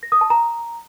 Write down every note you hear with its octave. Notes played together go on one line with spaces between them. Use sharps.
A#6
D#6
A5
A#5